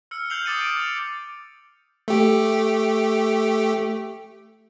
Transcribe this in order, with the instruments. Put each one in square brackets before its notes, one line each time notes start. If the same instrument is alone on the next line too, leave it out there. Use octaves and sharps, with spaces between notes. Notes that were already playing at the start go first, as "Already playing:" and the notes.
[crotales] E6 F6 C#7
F6 G6 C7 C#7 F7 F#7
D6 D#6 A6 C#7 D#7
D7
D6 F7
[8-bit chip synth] A3 G4